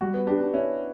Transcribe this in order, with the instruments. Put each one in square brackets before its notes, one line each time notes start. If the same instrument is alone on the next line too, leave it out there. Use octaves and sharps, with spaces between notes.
[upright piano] G3 [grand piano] F#4
[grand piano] B3
[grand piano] D4 [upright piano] G4
[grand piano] D4
[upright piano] C#4 [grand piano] E4